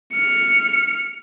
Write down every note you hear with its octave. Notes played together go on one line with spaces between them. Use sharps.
F6 C#7